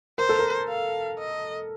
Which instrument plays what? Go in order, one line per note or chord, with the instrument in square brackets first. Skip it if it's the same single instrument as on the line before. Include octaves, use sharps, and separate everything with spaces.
[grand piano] A#4 [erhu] C5
[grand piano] A4
A#4
[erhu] F5
D#5